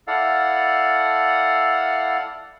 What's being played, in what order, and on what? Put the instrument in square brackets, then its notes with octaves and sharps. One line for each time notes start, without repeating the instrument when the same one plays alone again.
[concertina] E4 A4 D5 F5 F#5